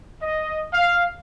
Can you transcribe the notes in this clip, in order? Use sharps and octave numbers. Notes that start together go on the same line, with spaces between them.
D#5
F5